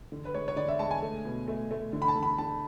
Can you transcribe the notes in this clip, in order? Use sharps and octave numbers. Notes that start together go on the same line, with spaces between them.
D3
B4
G#3 C#5
C#5
D3 D5
E5
G#3 A5
G#5
A3
B2
A3
A3
D3
B5
A5
D3
B5
D3 A5